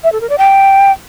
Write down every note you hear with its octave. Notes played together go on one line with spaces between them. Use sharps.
E5
A4
A#4
D5
G5